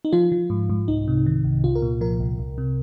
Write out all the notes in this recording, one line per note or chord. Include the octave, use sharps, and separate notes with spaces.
D#4
F3 F4
F3
G#2
G#2
C2 D#4
C3
D#3
C2
C2 F4
A#4
A#2
F3 A#4
C2
C2
C3